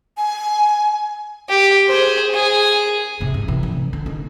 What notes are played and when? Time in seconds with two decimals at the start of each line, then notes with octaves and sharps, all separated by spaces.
0.17 G#5
1.49 G4
1.87 G#4 C5
2.34 G#4
3.20 A2 C3
3.34 G#2
3.48 C3 E3
3.63 D3
3.93 D3
4.06 D#4